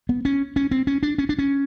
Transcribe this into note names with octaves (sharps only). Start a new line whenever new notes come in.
B3
C#4
C#4
C4
C#4
D4
C#4
D4
C#4